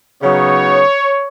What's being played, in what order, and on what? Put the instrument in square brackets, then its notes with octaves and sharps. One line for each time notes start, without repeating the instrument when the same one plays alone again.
[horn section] C#3 F#3 B3 D#4 C#5